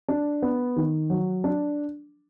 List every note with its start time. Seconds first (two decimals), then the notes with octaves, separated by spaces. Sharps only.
0.08 D4
0.42 B3
0.76 D#3
1.10 F#3
1.44 D4